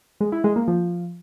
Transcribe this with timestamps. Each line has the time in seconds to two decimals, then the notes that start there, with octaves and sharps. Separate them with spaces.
0.21 G#3
0.32 E4
0.44 G#3
0.56 A#3
0.68 F3